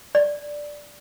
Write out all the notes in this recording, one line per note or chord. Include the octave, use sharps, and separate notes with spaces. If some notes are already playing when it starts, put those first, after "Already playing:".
D5